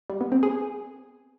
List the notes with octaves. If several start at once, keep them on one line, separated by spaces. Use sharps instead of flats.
G3
B3
C4
G#4